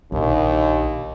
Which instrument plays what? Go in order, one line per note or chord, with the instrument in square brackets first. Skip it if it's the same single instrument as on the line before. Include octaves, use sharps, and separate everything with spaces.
[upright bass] A#1 [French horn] D#2